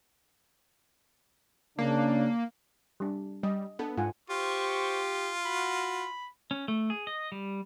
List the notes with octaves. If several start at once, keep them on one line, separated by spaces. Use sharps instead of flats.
C#3 A#3 D4
G3 D4
G3 D#5
B3 D4 A4
G#2 F4 F#5 G#5
F4 G4 C5 C#6
F#4 B5
C#4
A3
G#4
D#5
G3